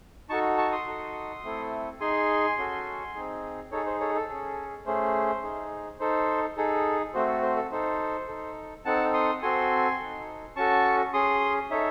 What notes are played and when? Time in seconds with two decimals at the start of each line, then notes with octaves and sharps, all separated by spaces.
0.29 D#4 F#4 A4 A5 C#6
0.58 A5 C#6
0.72 C6 D#6
0.87 D#4 F#4 A4
1.44 A3 C4 E4 A4
2.00 D#4 G#4 G#5 C6
2.58 C#4 F#4 A4
3.15 C4 D#4 G#4
3.72 D#4 G#4 A4 C#5
3.86 C5
4.00 A4 C#5
4.15 A4
4.29 C#4 G#4
4.86 A3 C#4 G#4 C5
5.43 D#4 G#4
6.00 D#4 A4 C5
6.57 D#4 G#4 A4
7.14 A3 C4 F#4 C5
7.28 A4
7.42 C5
7.56 A4
7.71 D#4 A4 C5
8.28 D#4 A4
8.85 C4 D#4 A4 F#5 A5
9.14 C6 D#6
9.42 C4 F#4 A4 G#5 C6
10.00 D#4 A4
10.56 C#4 F#4 A4 A5 C#6
11.13 C#4 G#4 C6 D#6
11.71 D#4 A4 C#5 E5